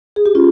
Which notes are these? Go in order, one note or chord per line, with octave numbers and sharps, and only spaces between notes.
G#4
G4
C#4 F4